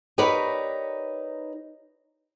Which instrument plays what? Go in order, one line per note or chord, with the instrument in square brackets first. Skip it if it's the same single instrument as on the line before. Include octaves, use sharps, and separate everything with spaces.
[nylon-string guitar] D#4 G4 A#4 B4 C#5 D5